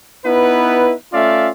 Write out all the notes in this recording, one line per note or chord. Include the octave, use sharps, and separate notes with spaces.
B3 D#4 E4 B4
A3 C#4 F4 D5 E5 F5